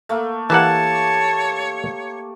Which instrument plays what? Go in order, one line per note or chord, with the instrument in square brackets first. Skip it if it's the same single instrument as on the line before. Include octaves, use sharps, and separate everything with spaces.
[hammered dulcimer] A3 A#3
[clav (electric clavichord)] E3 A#3 F#5 [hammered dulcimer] G4 [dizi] C#5 [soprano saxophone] A5